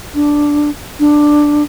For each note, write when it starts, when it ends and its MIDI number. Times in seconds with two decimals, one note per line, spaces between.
0.15 0.70 62
1.00 1.63 62